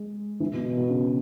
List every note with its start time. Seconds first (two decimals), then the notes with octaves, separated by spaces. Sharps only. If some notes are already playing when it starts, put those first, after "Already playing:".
Already playing: G#3
0.40 E3
0.53 B2
0.65 B2
0.77 B2
0.89 C#3